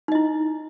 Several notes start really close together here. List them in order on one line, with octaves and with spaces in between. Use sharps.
D#4 D#5 E4